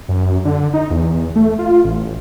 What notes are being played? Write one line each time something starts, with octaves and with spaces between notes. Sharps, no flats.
F#2
D3
D#4
E2
A3
F4
A1